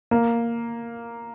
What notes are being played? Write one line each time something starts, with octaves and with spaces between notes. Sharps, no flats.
A#3